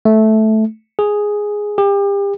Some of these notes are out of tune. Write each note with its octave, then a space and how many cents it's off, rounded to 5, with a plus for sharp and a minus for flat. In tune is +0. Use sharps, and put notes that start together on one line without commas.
A3 -10
G#4 +0
G4 +35